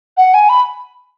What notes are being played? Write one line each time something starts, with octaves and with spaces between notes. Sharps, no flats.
F#5
G#5
B5